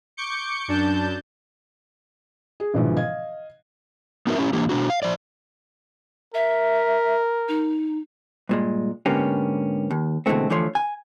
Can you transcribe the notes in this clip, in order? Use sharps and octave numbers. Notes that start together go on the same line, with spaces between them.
C#6 D6 G6 C#7
F#2 D4 A5 G6
G#4
G#1 B2 D3 E3 F3 G#3
D#5 F5 G#6
B3 D#4 F#4 A#4 E5
C#4 E4 G4
E3 A#3 D4 G4
B2 D#3 D4 F#4
F5
F3 C5 D5
A#4 E5
D#4
G2 A#2 G#3
G#2 D3 A#3 B3 C#4 G4
D#2
B2 D3 E3 G#3 A3 C4
D3 E3 F3 A3 C#5 C6
G#5